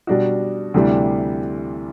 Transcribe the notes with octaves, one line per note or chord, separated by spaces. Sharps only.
B2 G3 D4 F#4
D2 C3 E3 G3 D4